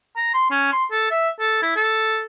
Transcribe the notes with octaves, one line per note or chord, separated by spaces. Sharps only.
A#5
C6
C#4
C6
A4
E5
A4
E4
A4